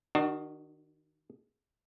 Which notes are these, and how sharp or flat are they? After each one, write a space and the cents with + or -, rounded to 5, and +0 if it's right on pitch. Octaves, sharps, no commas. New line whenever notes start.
D#3 +0 D4 +40 F#4 +25